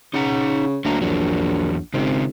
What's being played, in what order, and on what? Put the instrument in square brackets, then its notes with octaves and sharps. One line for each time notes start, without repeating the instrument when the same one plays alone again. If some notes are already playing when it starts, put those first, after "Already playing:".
[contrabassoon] C#3 [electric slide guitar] D#4 F#5 A#5
[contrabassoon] D2 [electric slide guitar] F#3 A#3 A#5
[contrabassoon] A#1 [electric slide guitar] E2 F#3
[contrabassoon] G#1 [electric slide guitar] C#3 C4